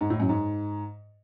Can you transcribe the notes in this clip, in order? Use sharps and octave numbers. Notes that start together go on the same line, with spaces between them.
G#2
A2
F#2
G#2